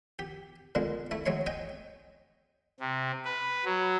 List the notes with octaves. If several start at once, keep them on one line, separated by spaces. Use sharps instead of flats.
G4
A#2 D3 G#3
A3 E4
F#3 G#3 C#5 C6
D#5 G5 G#5 D#6
C3
B4
F#3